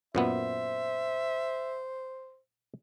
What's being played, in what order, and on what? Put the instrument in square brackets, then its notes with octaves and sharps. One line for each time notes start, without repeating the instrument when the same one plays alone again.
[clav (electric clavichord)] F#2 A#2 B3 [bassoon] C5 [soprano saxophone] E5